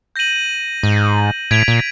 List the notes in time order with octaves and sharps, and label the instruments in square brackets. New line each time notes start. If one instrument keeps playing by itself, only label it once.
[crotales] G6 A#6 D#7 F#7
[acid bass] G#2
[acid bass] A2 [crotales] G#6 B6 D7 F7
[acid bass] A#2